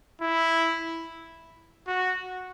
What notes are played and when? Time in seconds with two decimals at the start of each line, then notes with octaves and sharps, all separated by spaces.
0.21 E4
1.87 F#4